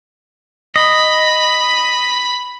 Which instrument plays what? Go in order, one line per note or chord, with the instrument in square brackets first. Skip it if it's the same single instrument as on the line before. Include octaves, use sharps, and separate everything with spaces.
[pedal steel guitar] D#5 [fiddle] B5